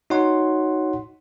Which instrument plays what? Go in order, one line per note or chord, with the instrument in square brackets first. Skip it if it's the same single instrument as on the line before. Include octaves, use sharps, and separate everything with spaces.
[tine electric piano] D#4 F#4 C#5 F#5 C6